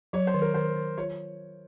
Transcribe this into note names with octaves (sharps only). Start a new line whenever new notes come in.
F#3 C#5
C5
D#3
A#4
D#3 C5
D#3
F4 C#5